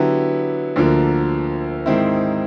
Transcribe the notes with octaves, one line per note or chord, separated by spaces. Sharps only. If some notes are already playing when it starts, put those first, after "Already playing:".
Already playing: D3 F#3 B3 E4 G4
D2 D3 F3 A#3
G#2 D#3 G#3 C4 E4